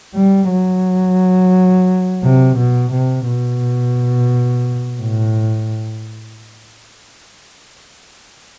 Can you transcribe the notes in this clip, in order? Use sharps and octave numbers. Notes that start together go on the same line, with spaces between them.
G3
F#3
C3
B2
C3
B2
A2